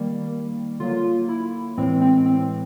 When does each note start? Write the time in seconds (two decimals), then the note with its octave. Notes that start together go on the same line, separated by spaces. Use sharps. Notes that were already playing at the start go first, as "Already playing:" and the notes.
Already playing: D#3 G3 A#3
0.80 D3 F#3 A#3 F4
1.29 E4
1.78 A2 E3 G#3 C4
2.01 C4
2.26 C4